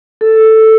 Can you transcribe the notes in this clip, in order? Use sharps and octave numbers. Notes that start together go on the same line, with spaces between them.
A4